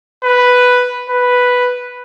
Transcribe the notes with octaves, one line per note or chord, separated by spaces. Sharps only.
B4
B4